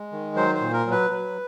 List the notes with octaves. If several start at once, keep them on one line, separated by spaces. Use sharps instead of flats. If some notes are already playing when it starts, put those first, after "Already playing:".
Already playing: G#3
D#3
F#3 C5
C5
A#2
A#4
F#3
B4
F#3